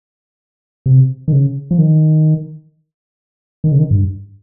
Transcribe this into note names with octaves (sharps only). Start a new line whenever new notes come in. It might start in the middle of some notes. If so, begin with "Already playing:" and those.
C3
D#3
C#3
F3
D#3
D#3
C#3
D#3
G#2
G2